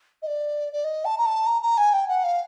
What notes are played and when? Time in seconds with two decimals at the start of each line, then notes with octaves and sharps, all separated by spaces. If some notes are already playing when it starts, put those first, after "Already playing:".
0.22 D#5
0.27 D5
0.72 D5
0.84 D#5
1.05 A5
1.18 A#5
1.26 A5
1.46 A#5
1.62 A#5
1.77 G#5
1.93 G5
2.08 F#5
2.24 F5